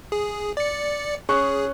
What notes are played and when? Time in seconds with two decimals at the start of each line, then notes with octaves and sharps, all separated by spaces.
0.12 G#4
0.57 D5 C#7
1.29 C#4 G#4 C#6 F#6